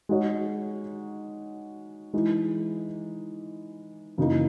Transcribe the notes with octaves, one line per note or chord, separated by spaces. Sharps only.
G#3 D#4 F#4 C#5
E3 G#3 D#4
F#2 C#3 E3 A#3 D#4